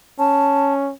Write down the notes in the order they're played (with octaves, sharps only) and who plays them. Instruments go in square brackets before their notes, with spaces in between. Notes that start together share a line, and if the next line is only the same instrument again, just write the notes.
[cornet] C#4 [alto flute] A5